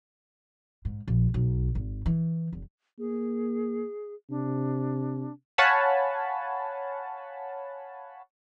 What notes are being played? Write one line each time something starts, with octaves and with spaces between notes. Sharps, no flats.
G#2
A#1
B1
G#1
E3
F1
A#3 G#4
C3 D4
C#5 F5 F#5 G#5 A5 B5